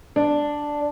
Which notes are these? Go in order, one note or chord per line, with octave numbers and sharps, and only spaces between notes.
D4